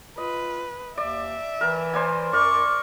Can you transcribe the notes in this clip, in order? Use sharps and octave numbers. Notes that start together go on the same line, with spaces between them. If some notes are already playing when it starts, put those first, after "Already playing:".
F4 B4 D#5
D#2 D5 E5
E3 A#4 A5
C5 D5 G#5
F#2 A#4 D5 C#6 D6